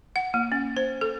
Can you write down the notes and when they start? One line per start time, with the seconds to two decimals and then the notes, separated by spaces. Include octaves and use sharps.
0.16 F#5
0.34 A#3
0.52 C#4
0.77 C5
1.01 A4